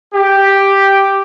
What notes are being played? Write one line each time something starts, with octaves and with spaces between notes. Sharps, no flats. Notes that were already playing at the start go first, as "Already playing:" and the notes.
G4